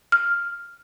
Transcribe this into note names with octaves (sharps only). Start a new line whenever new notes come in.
F6